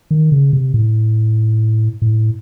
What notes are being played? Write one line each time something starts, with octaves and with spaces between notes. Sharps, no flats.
D#3
C#3
C3
A2
A2